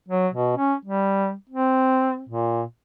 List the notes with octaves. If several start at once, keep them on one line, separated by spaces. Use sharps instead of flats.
F#3
B2
C#4
G3
C4
A#2